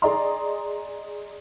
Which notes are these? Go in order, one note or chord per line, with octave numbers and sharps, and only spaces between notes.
G#4 D5 D#5 A#5 C6